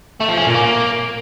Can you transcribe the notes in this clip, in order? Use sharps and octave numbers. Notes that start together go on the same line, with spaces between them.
A3
F3
C#4
A#2
A#3